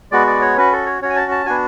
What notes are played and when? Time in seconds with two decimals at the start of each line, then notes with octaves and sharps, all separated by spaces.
0.12 G#3 B3 F#4 D5
0.27 D5
0.41 C#5
0.57 C#4 F#4 B4
0.72 A4
0.86 C#5
1.02 C#4 F#4 C#5
1.10 G#5
1.16 A5
1.31 A5
1.46 B3 D4 F#4 G#5